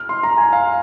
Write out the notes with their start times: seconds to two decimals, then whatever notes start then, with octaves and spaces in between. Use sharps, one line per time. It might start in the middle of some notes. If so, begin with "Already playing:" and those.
Already playing: F6
0.09 C6
0.23 A#5
0.38 G#5
0.53 F5